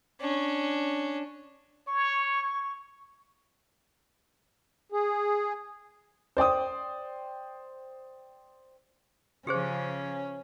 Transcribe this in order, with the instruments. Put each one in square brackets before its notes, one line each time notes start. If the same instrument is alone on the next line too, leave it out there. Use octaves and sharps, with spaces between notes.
[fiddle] C#4 D4
[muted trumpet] C#5 [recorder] C#6
[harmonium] G#4
[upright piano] C5 D5 G5 D#6
[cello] C#3 F3 [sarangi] C#4 [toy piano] G4 G#4 C5